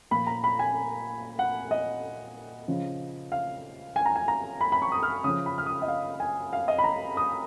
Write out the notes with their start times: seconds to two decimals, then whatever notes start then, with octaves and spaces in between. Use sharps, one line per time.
0.11 A#2 F3 B5
0.27 A#5
0.44 B5
0.59 G#5
1.39 F#5
1.71 D#5
2.68 C#3 F3
3.32 F5
3.96 G#5
4.06 A#5
4.16 G#5
4.28 A#5
4.61 B5
4.72 B5
4.82 C#6
4.92 D#6
5.03 F6
5.24 C#3 F3 D#6
5.46 B5
5.58 F6
5.66 D#6
5.82 D#5
5.88 F5
6.20 G#5
6.53 F5
6.68 D#5
6.78 B5
6.84 A#5
7.17 D#6